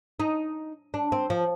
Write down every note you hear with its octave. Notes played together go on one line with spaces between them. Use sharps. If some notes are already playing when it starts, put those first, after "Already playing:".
D#4
D4
C4
F3